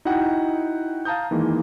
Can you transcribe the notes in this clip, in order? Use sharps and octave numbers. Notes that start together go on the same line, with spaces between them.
D#4 E4 F#4 D#5 F#5 G5
F5 A5 A#5 D#6 G6
D#3 E3 G#3 A#3